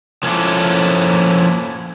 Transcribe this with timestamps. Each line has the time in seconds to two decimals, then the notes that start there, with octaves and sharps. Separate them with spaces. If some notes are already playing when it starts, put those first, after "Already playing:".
0.23 F3 A#3 C#4 E4 A4